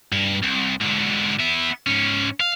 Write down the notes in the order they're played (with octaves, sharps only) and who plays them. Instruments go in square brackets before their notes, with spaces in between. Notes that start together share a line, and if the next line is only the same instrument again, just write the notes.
[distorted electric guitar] G2
C2
G#2 D3
B3 E5
G#2 C#4
F5